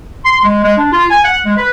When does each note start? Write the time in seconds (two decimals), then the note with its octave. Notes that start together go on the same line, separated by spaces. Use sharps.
0.25 C6
0.44 G#3
0.64 G#3
0.78 D4
0.92 F4
1.10 G#5
1.25 F#5
1.46 G#3
1.58 B4